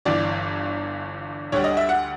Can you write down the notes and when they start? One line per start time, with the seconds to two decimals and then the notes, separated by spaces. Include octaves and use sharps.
0.05 G1 G2 E3 D5
1.52 D2 D3 G3 C#5
1.64 D#5
1.77 E5
1.89 F#5